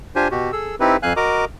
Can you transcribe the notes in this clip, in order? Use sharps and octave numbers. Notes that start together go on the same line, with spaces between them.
D4 F4 G4 C5 G#5
B2 F#4 G4
G#4 A4 E6
C4 D#4 E4 G4 B4
F2 F5 G#5 F#6
F#4 A#4 D#5 A#5 D6